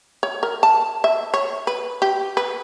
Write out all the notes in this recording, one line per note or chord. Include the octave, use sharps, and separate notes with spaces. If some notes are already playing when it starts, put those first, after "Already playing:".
C#5
A#4
A5
E5
C#5
B4
G4
B4